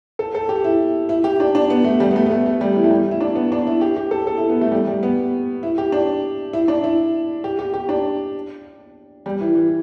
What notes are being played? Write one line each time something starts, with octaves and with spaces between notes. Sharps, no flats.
A4
A4
G4
E4
E4
G4
D4
D4
B3
A3
G3
B3
A3
B3
A3
A3
G3
E3
A3
G3
E4
D4
B3
D4
E4
G4
G4
A4
A4
E4
B3
A3
G3
G3
B3
E4
G4
D4
E4
D4
E4
G4
G4
G4
D4
G3
E3
E3